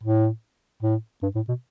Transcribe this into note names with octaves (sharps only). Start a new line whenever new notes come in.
A2
A2
G2
A2
B2